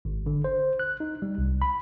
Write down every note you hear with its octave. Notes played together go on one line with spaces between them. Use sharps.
G#1
D3
C5
F#6
D#4
G3
C2
B5